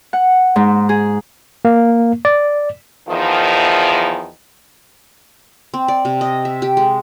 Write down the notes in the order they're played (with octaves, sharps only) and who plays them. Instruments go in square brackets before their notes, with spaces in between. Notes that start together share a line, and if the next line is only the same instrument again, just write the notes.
[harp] F#5
G#2
G#4
[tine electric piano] A#3
D5
[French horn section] E2 D#3 F3
[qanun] C4
D5
C3
D#5
E5
G4
G#3